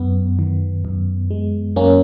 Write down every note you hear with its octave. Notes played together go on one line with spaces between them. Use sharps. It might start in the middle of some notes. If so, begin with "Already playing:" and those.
Already playing: F#2 B3
D#3
F#2
G#3
F#2 A#3 C#4